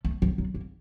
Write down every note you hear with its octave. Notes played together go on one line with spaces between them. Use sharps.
A3
F3
F#3
A#3